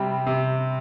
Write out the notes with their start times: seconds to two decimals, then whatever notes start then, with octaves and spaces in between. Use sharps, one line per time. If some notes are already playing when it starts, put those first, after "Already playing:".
Already playing: C3 G3 C4 B5
0.26 C3